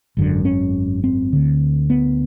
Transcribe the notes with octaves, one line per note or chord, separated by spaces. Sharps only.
G#1 F#2 D3
C#4
C4
D2 D3
B3